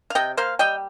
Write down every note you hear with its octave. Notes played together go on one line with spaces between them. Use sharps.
F5
C3 D#5 G5
A#3 C5 F5
G3 D#5 G5